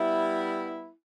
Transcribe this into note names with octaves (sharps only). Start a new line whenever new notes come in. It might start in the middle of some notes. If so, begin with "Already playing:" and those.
Already playing: G3 B3 E4